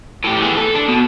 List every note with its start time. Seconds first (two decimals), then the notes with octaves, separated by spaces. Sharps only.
0.24 A2 G4
0.42 E3 G#4
0.57 A4
0.75 D4
0.88 B2